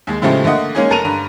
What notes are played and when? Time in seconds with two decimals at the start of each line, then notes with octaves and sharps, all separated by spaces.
0.07 D#2 G#3
0.22 A2 C#3 F3 G#3 A3 G4
0.44 D3 A3 A#3 D#5 F#5
0.75 G#3 A#3 C#4 D#4 G#4
0.90 F1 A4 A#4 A5 D#7 F7
1.04 G2 D3 A#5